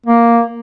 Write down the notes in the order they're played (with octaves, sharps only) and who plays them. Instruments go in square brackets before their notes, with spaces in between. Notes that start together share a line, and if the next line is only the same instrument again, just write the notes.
[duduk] A#3